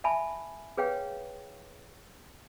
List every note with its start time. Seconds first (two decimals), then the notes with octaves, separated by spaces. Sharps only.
0.04 E5 G#5 A5 B5
0.78 G#4 B4 C#5 F5 G5